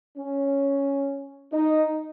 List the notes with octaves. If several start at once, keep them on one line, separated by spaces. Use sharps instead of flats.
C#4
D#4